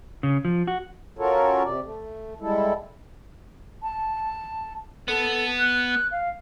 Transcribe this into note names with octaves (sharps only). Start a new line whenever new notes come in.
C#3
F3
F#4
C#4 F4 F#4 A4 A#4 C#5
C3 D5
A3
G3 G#3 E4 A4
A5
B3 A4
F#6
F5